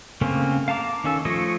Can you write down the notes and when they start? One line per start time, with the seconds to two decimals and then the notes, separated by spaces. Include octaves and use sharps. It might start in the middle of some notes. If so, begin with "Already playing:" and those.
0.21 C#3 A3 A#3 C4 C#4
0.68 F5 A5 A#5 D6
1.04 D#3 C#4 A4
1.25 F3 A3 C#5 D#5